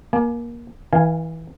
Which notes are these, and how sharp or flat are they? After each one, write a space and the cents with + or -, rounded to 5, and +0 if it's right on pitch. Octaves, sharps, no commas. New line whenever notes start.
A#3 +20 G#5 +35
E3 -25 F5 +0 G#5 +0